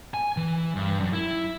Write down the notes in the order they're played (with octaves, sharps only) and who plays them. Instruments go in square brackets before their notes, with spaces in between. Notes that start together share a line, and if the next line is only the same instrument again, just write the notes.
[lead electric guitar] G#5
E3
G2
F#2
E4